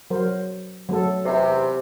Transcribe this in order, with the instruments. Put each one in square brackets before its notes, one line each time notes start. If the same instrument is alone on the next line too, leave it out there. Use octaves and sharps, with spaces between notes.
[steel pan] F#3 A#4 C5
F#3 A3 A4
[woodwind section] E2 C3